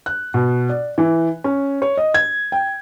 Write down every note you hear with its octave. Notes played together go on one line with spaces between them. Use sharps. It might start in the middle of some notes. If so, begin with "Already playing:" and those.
F#6
B2
D5
E3
C#4
C#5
D#5
G#6
G5